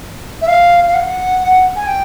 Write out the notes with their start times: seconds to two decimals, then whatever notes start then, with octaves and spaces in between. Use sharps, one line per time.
0.41 E5
0.47 F5
0.87 F5
0.94 F#5
1.75 G#5
1.86 G5